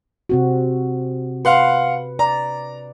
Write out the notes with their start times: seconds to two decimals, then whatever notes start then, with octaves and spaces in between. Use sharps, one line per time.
0.29 C3 C4 F#4
1.45 B4 F5 F#5 C6
2.19 D5 A#5